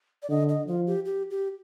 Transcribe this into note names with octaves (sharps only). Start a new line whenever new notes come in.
D5
D3 D#5
D#5
F3 F4
G4
G4
G4